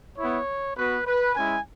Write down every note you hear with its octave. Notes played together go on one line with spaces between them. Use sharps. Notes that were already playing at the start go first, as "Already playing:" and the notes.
B3 E4 C#5
B3 F#4 B4
B4
G#3 C#4 E4 G#5